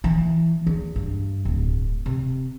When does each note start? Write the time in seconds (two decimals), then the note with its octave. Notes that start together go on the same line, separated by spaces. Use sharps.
0.04 E3
0.67 E2
0.96 G2
1.45 D1
2.06 C3